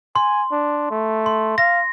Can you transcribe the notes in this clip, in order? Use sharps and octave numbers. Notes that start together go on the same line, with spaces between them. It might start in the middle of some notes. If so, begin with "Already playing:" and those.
G#5 C6
D4
A3
C6
F5 A#6